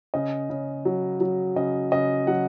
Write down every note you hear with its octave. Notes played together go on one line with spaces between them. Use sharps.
C#3 D#5
C#3
F#3
F#3
C#3 D#5
C#3 D#5
F#3 F#5